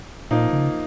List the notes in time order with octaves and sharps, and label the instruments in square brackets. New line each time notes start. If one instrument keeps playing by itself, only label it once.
[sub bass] A#2 [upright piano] F3 A#3 D#4
[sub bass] C#3